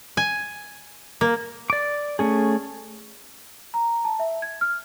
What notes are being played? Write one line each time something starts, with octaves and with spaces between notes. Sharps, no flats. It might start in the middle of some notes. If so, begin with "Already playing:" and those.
G#5
A#3
D5 D6
A3 C#4 G#4
A#5
A5
E5
G#6
F6